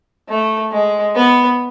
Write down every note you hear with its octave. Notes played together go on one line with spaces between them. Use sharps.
A3
G#3
B3